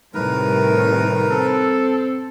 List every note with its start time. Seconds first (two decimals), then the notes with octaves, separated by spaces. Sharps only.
0.14 A2 C3 D#3 G3 A#4 B4
1.30 C4 A4